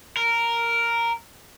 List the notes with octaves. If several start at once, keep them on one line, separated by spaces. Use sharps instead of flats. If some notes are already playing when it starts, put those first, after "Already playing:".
A#4